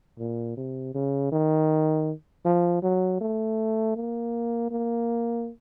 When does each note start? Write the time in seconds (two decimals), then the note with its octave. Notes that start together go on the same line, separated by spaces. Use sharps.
0.19 A#2
0.57 C3
0.95 C#3
1.32 D#3
2.45 F3
2.83 F#3
3.21 A3
3.96 A#3
4.71 A#3